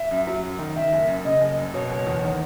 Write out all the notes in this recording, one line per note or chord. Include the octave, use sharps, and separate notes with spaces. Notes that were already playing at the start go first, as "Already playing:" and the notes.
Already playing: E5
F#2
F#3
F#2
D#3
D#3 E5
F#1
F#2
C#3 D#5
F#1
F#2
B2 C#5
F#1
E2
D#3